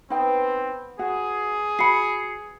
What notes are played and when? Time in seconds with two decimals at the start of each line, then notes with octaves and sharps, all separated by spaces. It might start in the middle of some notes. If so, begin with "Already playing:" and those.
0.10 B3 C4 D#4 G5
0.99 F#4 G#4
1.79 F#4 B5 C7 C#7